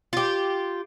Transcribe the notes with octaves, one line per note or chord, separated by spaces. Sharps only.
F4 G4